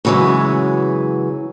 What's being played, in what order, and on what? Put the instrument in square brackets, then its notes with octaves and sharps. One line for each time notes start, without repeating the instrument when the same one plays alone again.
[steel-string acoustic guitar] F#2 C#3 E3 F#3 G#3